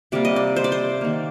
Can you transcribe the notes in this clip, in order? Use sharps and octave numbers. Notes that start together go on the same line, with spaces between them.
C3 G3 A#3 D5
D#5
D5
C5
D5
C5
D#3 A#3